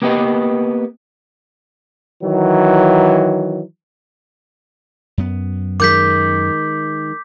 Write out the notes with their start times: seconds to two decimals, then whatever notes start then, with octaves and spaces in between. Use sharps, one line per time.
0.02 A#3 B3 G4 B4 D#5
2.22 D#3 E3 F#3
5.18 F#2 B3
5.80 D#3 G#3 D6 G6 B6